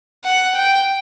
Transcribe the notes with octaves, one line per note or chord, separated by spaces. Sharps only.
F#5
G5